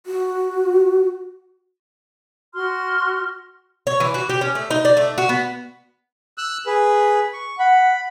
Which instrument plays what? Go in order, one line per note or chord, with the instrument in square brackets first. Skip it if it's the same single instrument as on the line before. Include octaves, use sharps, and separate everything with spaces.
[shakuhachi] F#4
[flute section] F#4 C6 F6
[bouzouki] C#5
E3
F#4
G4
C#4
A3
D#4
D5
A3
F#4
B3
[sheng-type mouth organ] E6 F#6
G#4 B4
C#6
[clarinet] F#5 [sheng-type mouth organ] B5